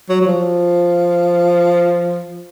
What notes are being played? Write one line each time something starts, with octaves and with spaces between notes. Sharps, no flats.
F#3
F#3
F3